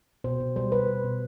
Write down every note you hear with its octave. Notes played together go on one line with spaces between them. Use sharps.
B2 C5
B2
G3 C5
G3 B4
B2
B2